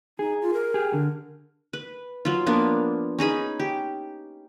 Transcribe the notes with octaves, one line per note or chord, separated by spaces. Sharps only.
D#4 G#4
F4
A#4
G4 G#4
D3
B4
F#3 F4
F3 A#3 B3 D4
C#4 D#4 G#4 B5
G4